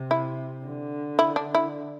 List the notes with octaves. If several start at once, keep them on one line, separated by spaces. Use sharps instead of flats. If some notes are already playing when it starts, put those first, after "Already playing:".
Already playing: C3
E4
D3
E4
D4
E4